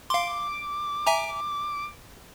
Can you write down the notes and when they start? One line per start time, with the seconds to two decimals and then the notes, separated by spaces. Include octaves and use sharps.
0.10 F5 C6 D6
1.07 E5 G#5 A#5